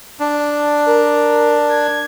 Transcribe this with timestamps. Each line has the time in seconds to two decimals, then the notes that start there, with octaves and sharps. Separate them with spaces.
0.20 D4
0.86 A#4
1.69 G#6